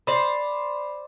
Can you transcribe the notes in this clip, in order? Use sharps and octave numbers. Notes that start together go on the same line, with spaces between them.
C5 D5 B5